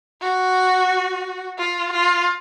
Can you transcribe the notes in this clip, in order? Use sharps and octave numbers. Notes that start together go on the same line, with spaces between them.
F#4
F4
F4